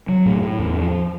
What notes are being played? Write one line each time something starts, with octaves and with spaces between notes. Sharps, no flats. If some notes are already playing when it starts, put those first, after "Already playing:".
F#3
A2
A2
E2
F3